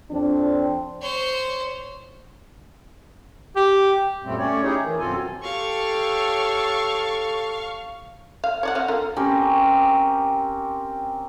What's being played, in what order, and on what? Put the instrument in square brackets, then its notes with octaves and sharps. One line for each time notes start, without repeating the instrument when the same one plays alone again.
[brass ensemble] F2 C4 D4
[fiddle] C5 C#5
[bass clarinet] G4
[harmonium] F#2 A#2 G3 A3 C4
A3 C#4 C#5 D5
C#4 D#4 E4 G4 G#4 C#5
D#3 E3
F#2 B2 C4 F4 A4 G#5
[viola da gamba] G4 C#5 [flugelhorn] A4 [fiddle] F5 [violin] C#6
[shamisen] F5
C#5 D5 F#5
C4 F5
D3 F4 A#4
[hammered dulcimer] C4 C#4 G4 A#4